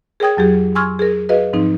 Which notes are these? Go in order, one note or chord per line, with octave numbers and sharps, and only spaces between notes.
G#4 A#4 C#5 G5 D#6 G#6
F2 F#3 G4 G#4
G#5 C6 C#6 E6 F6 G#6
G#4 A#4
F#4 G#4 B4 D#5 F5
G#2 F3 C4 D#4